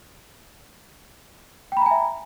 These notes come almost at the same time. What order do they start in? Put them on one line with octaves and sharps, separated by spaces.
G5 B5 A#5 G#5 E5